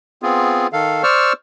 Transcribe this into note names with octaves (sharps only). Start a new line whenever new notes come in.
B3 C4 F4 G#4
D#3 A4 F5
C5 D5 C#6 E6 F6